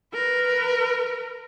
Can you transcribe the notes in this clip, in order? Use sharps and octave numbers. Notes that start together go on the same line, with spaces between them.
A#4 B4